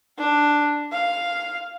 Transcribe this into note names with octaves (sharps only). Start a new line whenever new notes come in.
D4
F5